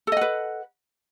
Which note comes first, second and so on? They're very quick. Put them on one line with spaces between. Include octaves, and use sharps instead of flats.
A4 D#5 F#5 B4